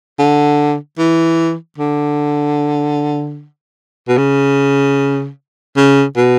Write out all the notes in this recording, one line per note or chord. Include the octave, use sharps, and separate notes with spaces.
D3
E3
D3
B2
C#3
C#3
B2